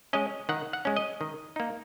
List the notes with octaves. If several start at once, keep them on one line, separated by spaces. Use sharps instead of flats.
G#3 C#4 D#5
D#3 F#5
F#5
G#3 C#4
D#5
D#3
A#3 D#4